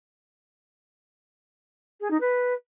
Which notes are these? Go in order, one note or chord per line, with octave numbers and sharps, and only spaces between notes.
G#4
D#4
B4